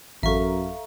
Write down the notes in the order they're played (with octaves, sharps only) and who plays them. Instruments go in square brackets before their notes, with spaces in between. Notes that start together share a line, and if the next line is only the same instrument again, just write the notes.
[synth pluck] A1 [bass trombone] F#2 [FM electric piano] A4 F5 A#5 [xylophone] E5 C#6